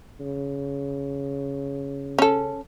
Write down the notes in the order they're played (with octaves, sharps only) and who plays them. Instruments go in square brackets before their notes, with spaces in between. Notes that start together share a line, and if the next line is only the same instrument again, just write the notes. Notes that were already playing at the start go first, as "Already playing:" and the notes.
[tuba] C#3
[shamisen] C#4 A4